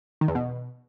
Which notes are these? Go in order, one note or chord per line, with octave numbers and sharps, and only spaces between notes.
D#3
E2
B2